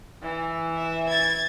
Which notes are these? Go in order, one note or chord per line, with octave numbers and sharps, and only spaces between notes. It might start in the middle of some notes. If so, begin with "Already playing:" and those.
E3
E5
G#6 A6